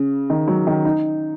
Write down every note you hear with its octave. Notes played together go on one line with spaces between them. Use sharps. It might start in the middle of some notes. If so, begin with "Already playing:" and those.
Already playing: C#3
D#3
F#3
D#3
D#4